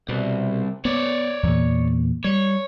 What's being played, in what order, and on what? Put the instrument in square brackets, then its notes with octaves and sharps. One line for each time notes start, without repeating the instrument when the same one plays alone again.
[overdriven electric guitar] C2 [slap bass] B2
[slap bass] B3 [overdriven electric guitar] C#5 D5
[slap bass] E2 A#2
[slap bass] G3 [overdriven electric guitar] C#5